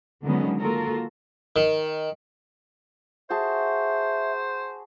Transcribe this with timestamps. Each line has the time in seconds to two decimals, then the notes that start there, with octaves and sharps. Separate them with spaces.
0.24 D3 D#3 F#3 G#3 B3 C#4
0.60 A#3 F4 F#4 A4 A#4
1.56 D#3
3.30 F#4 G#4 C5 E5 A5